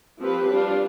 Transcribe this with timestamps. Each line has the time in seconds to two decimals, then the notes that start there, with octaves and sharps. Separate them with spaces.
0.20 F3 C4 G4 B4
0.48 G3 D4 F4